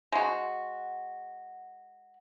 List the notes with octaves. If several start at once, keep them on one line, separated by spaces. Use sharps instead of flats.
G#3 F#4